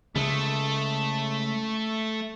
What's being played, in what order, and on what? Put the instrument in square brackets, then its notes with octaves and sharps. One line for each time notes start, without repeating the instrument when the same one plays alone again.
[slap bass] C#3 G#3 [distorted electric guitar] A3